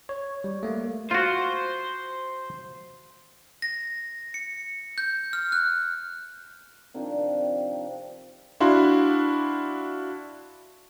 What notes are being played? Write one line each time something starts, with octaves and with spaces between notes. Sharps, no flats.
C#5
G3
A3 A#3
F4 F#4 C5
A#6
C#7
G6
F6
F#6
C3 D#3 F3 D4
D4 E4 F#4 F5 C6